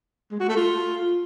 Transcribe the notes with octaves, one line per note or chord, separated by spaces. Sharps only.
G#3
F#4
A3
F4